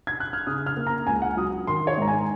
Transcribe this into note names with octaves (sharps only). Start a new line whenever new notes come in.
G#6
F#6
F6
C#3 D#6
F6
A#3
A#5
C#2 G#5
F#5
F#3 D#6
D#3 C6
C#5
G#2 A#5
G#5